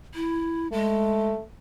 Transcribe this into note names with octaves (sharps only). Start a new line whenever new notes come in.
E4
G#3 A3